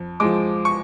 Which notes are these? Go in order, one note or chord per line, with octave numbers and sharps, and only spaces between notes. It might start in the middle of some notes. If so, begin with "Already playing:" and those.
Already playing: F2
F3 G#3 D6
C#6